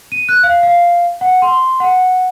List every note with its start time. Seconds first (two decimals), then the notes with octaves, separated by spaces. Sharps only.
0.12 D#7
0.29 F#6
0.43 F5
0.63 F5
1.21 F#5
1.42 C6
1.80 F#5